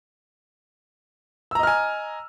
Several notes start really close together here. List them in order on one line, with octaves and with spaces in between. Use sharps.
E6 A#5 D#5 F6 G#5